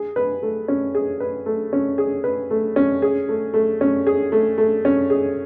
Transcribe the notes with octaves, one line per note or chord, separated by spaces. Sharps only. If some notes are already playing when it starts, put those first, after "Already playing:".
Already playing: G#4
B4
A3
C#4
G#4
B4
A3
C#4
G#4
B4
A3
C#4
G#4
A3
A3
C#4
G#4
A3
A3
C#4
G#4